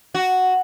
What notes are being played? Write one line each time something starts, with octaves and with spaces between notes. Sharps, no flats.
F#4